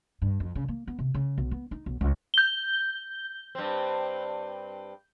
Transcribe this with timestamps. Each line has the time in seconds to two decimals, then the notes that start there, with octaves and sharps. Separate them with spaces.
0.22 G2
0.40 F2
0.55 C#3
0.68 A#3
0.87 B3
0.99 C3
1.14 C#3
1.38 B1
1.51 B3
1.71 D#4
1.86 B1
2.01 C#2
2.34 G6 G7
3.55 G2 C4